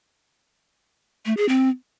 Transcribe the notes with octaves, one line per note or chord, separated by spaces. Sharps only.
A3
G#4
C4